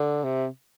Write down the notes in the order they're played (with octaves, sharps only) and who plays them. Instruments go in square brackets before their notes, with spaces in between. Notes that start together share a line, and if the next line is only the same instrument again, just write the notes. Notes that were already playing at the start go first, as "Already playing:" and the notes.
Already playing: [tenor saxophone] D3
C3